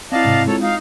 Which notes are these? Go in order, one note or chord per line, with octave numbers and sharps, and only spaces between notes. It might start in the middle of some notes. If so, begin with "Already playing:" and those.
C4 E4 D5 D#5 F5 A5
G#2 C3
G#3 F4 A4 C#5
D#4 F5